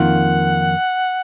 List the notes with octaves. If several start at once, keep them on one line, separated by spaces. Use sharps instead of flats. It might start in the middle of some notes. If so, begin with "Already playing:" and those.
Already playing: F2 D#3 A#3 F4 F#5